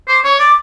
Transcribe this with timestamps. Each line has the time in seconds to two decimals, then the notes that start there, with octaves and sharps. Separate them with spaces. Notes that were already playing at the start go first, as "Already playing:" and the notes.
0.08 C5 D6
0.24 C#5 C#6
0.39 D5 D6